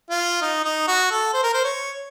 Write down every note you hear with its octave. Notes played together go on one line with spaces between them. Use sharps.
F4
D#4
D#4
F#4
A4
C5
A#4
C5
C#5